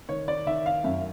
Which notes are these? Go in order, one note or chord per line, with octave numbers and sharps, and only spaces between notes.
D#3 C#5
D5
D#3 E5
F5
F#2 E5